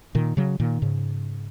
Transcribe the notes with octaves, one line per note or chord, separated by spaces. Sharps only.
A#2 D#3
C#3 F#3
A#2 D#3
G#2 C#3